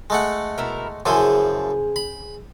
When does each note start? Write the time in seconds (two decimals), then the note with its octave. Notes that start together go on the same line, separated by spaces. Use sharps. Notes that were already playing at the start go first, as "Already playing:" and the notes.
0.10 G#3 A3 F#5
0.58 B2 E4 A#4
1.06 F#2 C#3 F3 E4 G#4 C5
1.96 B5